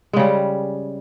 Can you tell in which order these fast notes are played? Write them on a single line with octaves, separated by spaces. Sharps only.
G#3 C#3 G3